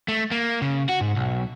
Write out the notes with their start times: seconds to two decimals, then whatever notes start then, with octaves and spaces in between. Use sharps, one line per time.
0.08 A3
0.31 A#3
0.62 C#3
0.89 F#4
1.01 G#2
1.16 B1